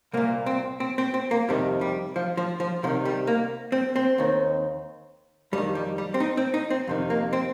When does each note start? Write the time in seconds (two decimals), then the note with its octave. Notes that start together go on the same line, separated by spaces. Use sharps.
0.13 C2 A#2 A#3
0.46 C4
0.80 C4
0.98 C4
1.14 C4
1.31 A#3
1.48 F2 C3 D#3 G3
1.81 G3
2.16 F3
2.37 F3
2.60 F3
2.83 C2 C3 D#3 F3
3.05 G3
3.27 A#3
3.72 C4
3.96 C4
4.18 D#2 D#3
5.52 F2 G3
5.58 D#3
5.75 G3
5.98 G3
6.14 C4
6.20 D#4
6.37 C4
6.54 D#4
6.70 C4
6.87 F2 C3 D#3
7.10 A#3
7.33 C4